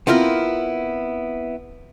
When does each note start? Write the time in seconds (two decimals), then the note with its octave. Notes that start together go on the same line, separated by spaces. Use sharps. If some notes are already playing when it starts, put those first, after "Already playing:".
0.07 B3 C4 E4 F4 A#4